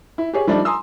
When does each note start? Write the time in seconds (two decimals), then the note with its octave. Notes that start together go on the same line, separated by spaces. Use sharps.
0.18 E4
0.33 G4 G#4 C#5
0.47 F3 G3 A3 D4 D#4
0.65 G#5 A#5 C6 D#6 E6